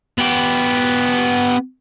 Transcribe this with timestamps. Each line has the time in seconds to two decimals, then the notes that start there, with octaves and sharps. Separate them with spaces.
0.18 B3 G4